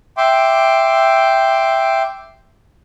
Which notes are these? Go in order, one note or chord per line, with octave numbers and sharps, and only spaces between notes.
E5 G5 C6 D6